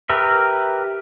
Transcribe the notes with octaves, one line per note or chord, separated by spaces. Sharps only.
G4 A#4 B4 E5